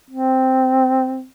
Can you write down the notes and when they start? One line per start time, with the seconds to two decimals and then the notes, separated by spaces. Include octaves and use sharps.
0.10 C4